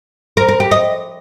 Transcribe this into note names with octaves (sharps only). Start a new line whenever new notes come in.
A#4
A#4
G4
D#5